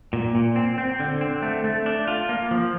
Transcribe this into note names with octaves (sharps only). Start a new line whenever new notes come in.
A#2
A#2
C4
C4
D3
C4
A3
A3
D4
F4
A#3
F3